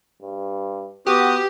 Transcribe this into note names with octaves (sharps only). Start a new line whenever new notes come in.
G2
B3 F#4 G4 D#6